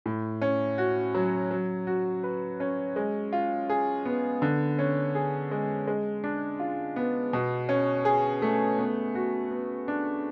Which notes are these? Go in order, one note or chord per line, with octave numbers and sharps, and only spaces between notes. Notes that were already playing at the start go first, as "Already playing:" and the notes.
A2
C#4
F#4
F#3
F#3
F#4
B4
C#4
G#3
F4
G#4
B3
D3
C#4
G#4
G#3
G#3
D4
F4
B3
B2
C#4
G#4
A3
B3
F#4
B3
D4